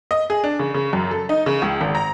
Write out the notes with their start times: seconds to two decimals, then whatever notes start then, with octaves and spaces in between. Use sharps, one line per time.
0.11 D#5
0.30 G#4
0.44 D4
0.59 C#3
0.74 C#3
0.93 F#2
1.11 A4
1.29 D#4
1.46 C#3
1.62 C#2
1.81 G#1
1.95 A#5